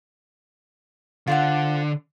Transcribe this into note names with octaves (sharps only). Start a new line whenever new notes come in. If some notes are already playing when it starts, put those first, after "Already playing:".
D3 F4 C5 F#5